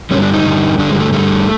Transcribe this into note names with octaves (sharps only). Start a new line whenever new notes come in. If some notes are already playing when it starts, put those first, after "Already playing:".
G2 D3 G3 C#4
D4
D#4
G2 D3 G3
G2 D3 G3 D4
G#3
A3
G2 D3 G3 A3